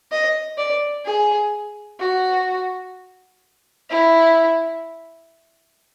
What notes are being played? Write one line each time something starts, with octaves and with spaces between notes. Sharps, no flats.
D#5
D5
G#4
F#4
E4